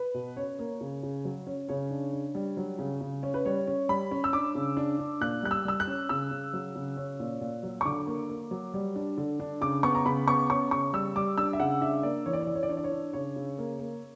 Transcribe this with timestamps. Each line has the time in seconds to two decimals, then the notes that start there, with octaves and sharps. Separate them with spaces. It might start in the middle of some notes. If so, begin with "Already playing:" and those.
Already playing: B4
0.14 B2
0.37 C#4 C#5
0.59 A#3
0.81 C#3
1.03 C#3
1.25 F#3
1.47 C#4
1.69 C#3 C#5
1.91 D4
2.13 D4
2.35 G3
2.57 F#3
2.79 C#3
3.01 C#3
3.23 C#4
3.34 B4
3.45 G3 C#5
3.67 C#4
3.89 G3 B5
4.11 C#4
4.24 E6
4.33 D4 D6
4.55 C#3
4.77 D4
4.99 D4
5.21 A#2 F#6
5.43 G3 F#6
5.51 E6
5.65 G3 E6
5.80 F#6
5.87 C#4
6.09 C#3 E6
6.31 C#3
6.53 F#3
6.76 C#3
6.97 C#4
7.20 A#2
7.41 A#2
7.63 F#3
7.81 C#6
7.85 D3 D6
8.07 A#3
8.29 A#3
8.51 F#3
8.74 G3
8.96 D4
9.17 D3
9.40 D4
9.61 C#3 D6
9.83 B3 C#6
9.95 A#5
10.06 C#3 B5
10.28 B3 C#6
10.50 C#4 C#6
10.71 C#3 C#6
10.93 G3 E6
11.16 G3 D6
11.38 D4 E6
11.53 E5
11.59 C#3 F#5
11.81 D4 E5
12.03 A#3 D5
12.26 E3 C#5
12.33 D5
12.40 C#5
12.47 E3 D5
12.55 C#5
12.63 D5
12.69 D4 C#5
12.77 D5
12.84 C#5
12.92 D4
13.13 C#3 C#5
13.36 C#3
13.58 A#3
13.80 A#3